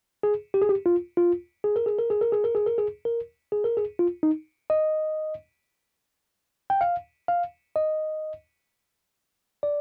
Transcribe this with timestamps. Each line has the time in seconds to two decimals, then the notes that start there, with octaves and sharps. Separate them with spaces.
0.23 G#4
0.54 G4
0.62 G#4
0.69 G4
0.86 F4
1.17 F4
1.64 G#4
1.76 A#4
1.86 G#4
1.99 A#4
2.10 G#4
2.21 A#4
2.32 G#4
2.44 A#4
2.55 G#4
2.66 A#4
2.78 G#4
3.05 A#4
3.52 G#4
3.64 A#4
3.77 G#4
3.99 F4
4.23 D#4
4.70 D#5
6.70 G5
6.81 F5
7.28 F5
7.76 D#5
9.63 D5